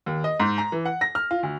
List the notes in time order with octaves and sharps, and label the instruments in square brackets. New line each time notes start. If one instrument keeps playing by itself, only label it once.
[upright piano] D#2
D#5
G#2
A#5
E3
F#5
A#6
F6
F4
D2